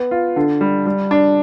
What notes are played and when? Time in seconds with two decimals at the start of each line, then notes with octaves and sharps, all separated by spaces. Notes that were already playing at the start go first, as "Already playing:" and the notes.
Already playing: B3
0.11 F4
0.36 D3
0.61 G3
0.86 G3
1.11 D4